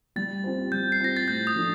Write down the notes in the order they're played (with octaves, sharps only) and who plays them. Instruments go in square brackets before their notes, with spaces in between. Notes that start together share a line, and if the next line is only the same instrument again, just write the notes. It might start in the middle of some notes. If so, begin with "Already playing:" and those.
[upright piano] G3 [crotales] A6
[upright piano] C4 F4 C5
[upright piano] G3 [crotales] G6
[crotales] C7
[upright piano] C4 F4 C5 [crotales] A#6
[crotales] A6
[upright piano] A2 [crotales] G6
[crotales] D#6
[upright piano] F3 A3 D4